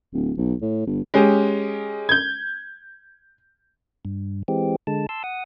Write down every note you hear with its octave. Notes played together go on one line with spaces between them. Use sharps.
D1
B1
A2
G1
G#3 C#4 G4
G6 G#6
G2
E3 G#3 C4 G4
D3 G#3 A5
A5 C6 E6
F#5 D#6